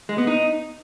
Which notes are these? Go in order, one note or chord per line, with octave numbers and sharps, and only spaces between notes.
G#3
B3
D#4